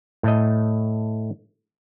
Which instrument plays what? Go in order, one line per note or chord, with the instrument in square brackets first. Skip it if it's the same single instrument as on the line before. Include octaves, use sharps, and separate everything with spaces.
[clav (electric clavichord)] A2 A3 D#5